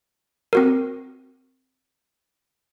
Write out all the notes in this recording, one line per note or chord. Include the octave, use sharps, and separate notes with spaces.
C4 F#4 A#4